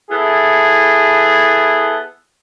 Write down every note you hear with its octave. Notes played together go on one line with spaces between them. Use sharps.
B3 E4 G#4 A4